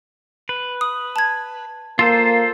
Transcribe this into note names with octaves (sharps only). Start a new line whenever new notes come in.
B4
D#6
A5 G#6
A#3 F4 A4 C5 C6